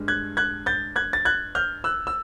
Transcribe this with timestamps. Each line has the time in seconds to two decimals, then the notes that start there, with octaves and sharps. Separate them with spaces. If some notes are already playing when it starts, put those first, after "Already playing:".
Already playing: G2 G#3
0.08 F#6 G#6
0.37 F#6 G#6
0.66 G6 A6
0.96 F#6 G#6
1.13 A6
1.25 F#6 G#6
1.55 F6 G6
1.84 E6 F#6
2.07 E6